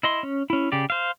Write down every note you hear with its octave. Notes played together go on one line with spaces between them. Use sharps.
E4 D#5 C6
C#4
C#4 E4
C#3 G4 D5
C5 F5